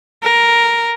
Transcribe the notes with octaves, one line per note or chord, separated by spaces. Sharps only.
A#4